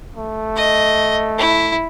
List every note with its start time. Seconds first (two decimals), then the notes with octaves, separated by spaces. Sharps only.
0.16 A3
0.56 D#5
1.38 E4